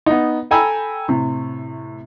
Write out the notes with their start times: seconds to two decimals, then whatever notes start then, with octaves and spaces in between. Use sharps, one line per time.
0.06 B3 D#4
0.51 A4 G5 G#5 A#5 B5 E6
1.08 A2 C3